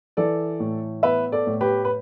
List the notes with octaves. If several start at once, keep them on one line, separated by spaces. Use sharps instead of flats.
E3 A4 D5
A2
B3 B4 E5
A4 D5
A2
G4 B4
B4